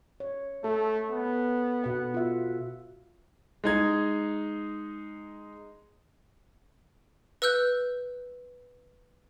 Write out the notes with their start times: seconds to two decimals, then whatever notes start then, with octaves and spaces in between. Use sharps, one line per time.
0.20 C#5
0.64 A3 A4
1.11 B3
1.84 B2 F#5
2.14 F4 E5
3.64 G#3 D#4 G#6
7.42 B4 E6 F#6 G6